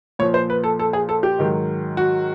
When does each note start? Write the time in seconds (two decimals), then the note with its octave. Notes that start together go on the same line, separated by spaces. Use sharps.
0.19 A#2 F3 C#5
0.34 C5
0.50 B4
0.64 A4
0.79 A4
0.93 G#4
1.09 A4
1.23 G4
1.39 G#2 D#3 F#3
1.97 F#4